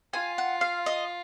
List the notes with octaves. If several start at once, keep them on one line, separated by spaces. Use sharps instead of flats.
F4 G#5
F#5
F5
D#5